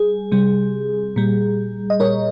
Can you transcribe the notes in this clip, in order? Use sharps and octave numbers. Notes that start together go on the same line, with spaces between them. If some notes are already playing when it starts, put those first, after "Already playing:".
Already playing: G3 G#4
C3 G3
A#2 G3
D#5
A#2 G3 A#4 C#5